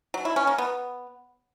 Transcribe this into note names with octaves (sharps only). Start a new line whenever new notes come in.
F#3
E4
C#4
A#3
B3